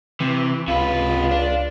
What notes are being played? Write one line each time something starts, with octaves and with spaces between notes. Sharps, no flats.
C3 E3
C#2 C3 F4 B4
D4